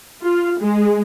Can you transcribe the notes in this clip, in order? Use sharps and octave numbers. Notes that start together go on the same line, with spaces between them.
F4
G#3